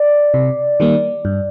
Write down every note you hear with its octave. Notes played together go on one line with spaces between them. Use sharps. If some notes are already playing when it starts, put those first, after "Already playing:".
Already playing: D5
C3
D#3 G3 A#3
G2